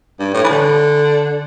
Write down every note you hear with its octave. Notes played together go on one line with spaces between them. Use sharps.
G2
A2
E3
D3